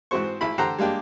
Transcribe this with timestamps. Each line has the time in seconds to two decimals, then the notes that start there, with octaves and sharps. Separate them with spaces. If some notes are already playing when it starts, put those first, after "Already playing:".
0.11 G#2 E3 C4 F#4 C5 C#6
0.41 G#1 E4 B5
0.58 D3 G4 C5 F#5 A#5 C6
0.78 G3 G#3 A#3 D4 G4